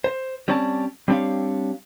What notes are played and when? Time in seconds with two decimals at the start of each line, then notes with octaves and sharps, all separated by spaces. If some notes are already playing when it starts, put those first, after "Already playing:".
0.04 C5
0.48 G3 C4 C#4 D5 A5
1.08 G3 C4 D4 G4 C#5 F5